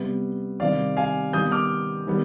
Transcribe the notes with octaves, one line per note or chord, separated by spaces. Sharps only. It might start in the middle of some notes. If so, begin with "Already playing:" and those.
Already playing: C3 G3 B3 B4
C3 D#3 G3 C4 D5 F5
F5 G#5
D#3 G3 B3 D#6 G6
D6 F6
D#3 G3 B3